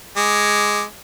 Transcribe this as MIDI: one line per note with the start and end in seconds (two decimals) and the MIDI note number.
0.17 0.83 56
0.17 0.83 86